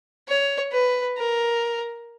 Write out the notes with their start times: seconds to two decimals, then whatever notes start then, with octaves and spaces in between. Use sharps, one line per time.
0.28 C#5
0.72 B4
1.17 A#4